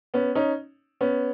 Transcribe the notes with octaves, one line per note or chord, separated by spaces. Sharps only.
B3 C#4
C#4 D#4
B3 C#4